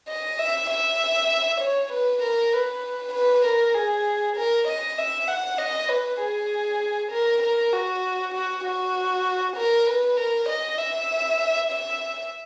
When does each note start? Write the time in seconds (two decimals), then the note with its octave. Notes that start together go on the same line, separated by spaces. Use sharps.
0.09 D#5
0.39 E5
0.69 E5
1.60 C#5
1.92 B4
2.22 A#4
2.53 B4
3.13 B4
3.45 A#4
3.74 G#4
4.36 A#4
4.67 D#5
4.98 E5
5.28 F#5
5.58 D#5
5.88 B4
6.20 G#4
7.11 A#4
7.42 A#4
7.73 F#4
8.34 F#4
8.64 F#4
9.56 A#4
9.86 B4
10.17 A#4
10.48 D#5
10.78 E5
11.71 E5